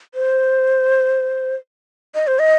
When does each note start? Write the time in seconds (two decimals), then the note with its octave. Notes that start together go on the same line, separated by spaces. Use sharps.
0.15 C5
2.15 D#5
2.27 C5
2.39 D#5